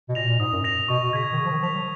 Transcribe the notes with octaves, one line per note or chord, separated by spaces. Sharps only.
B2
A#2 A#6 F7
A#2
G#2 D#6
F#2
A#6 F7
B2 C#6
B2
C#3 G#6 B6 F7
D#3
C#3 C#6
F3
D#3
F3 G#6 B6 F7
F#3